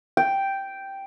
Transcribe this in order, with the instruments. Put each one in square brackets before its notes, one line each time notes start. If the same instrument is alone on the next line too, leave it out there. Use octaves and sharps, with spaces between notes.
[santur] G5